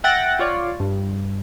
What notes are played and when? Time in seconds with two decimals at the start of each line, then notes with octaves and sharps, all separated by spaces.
0.04 E5 F#5 G5 A6 A#6
0.39 F4 C#5 D5
0.80 G2